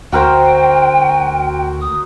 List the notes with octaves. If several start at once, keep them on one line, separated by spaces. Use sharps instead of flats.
D2 F#4 A#4 C5 G5
D#6